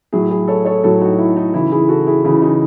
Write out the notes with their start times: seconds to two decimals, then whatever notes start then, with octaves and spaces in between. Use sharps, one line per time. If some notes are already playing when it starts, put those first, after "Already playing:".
0.13 A2 F#3 E4 G#4
0.30 E4 G#4
0.48 A4 C#5
0.65 A4 C#5
0.84 A2 F#3 F#4 A4
1.01 D#4 F#4
1.19 E4
1.37 D#4
1.54 C#3 E3 E4
1.72 E4 G#4
1.89 F#4 A4
2.07 E4 G#4
2.24 C#3 E3 E4 G#4
2.42 D#4 F#4